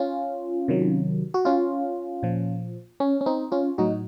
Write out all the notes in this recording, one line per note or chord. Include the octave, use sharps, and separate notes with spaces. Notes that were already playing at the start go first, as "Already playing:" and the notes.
Already playing: C#4 F4
C3 D#3 F#3
F#4
C#4 F4
A#2 F3
C#4
C#4
C4 D#4
C#4 F4
A2 F#3 D#4 F#4